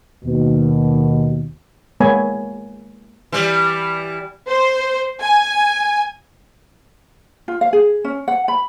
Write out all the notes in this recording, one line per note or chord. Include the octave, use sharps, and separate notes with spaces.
D#2 B2
G#3 A#3 B3 C#5 G#5 B5
E3 G3
C5
G#5
F4
F5
G#4
C#4
F#5
B5